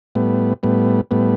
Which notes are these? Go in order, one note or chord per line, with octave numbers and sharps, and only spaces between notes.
A2 G3 B3
A2 G3 B3
A2 G3 B3